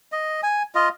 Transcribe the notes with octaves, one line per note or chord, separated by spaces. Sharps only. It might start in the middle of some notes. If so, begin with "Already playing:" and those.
D#5
G#5
F4 D#5